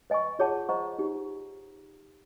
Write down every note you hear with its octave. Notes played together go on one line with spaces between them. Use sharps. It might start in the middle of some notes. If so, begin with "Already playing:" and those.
B4 D#5 G#5 C#6
F4 G#4 C#5 F#5 A5
C5 D#5 F#5 A#5 C#6
D#4 G4